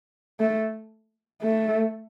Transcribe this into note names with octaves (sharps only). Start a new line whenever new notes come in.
A3
A3